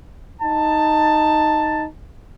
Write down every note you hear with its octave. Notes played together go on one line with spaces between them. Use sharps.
D#4 A5